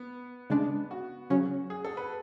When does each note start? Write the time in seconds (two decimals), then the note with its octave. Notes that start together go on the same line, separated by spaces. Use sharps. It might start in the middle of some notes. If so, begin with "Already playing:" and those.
Already playing: B3
0.50 C#3 G#3 D4
0.91 F#4
1.30 C#3 F#3 C#4
1.70 G#4
1.85 A4
1.97 B4